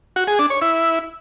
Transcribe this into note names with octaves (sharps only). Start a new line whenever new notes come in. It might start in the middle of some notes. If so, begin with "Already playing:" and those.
F#4
G#4
D4
C#5
E4